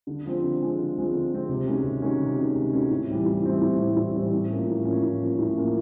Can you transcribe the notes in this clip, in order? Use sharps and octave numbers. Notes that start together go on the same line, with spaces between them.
D3
F3 G#3 C4
D3
F3 G#3 C4
D3
F3 G#3 C4
D3
F3 G#3 C4
C3
D#3 G#3 C#4 F#4
C3
D#3 G#3 C#4 F#4
C3
D#3 G#3 C#4 F#4
C3
D#3 G#3 C#4 F#4
A2
E3 G3 C4 E4
A2
E3 G3 C4 E4
A2
E3 G3 C4 E4
A2
E3 G3 C4 E4
A2
F3 A#3 C#4
A2
F3 A#3 C#4
A2
F3 A#3 C#4
A2
F3 A#3 C#4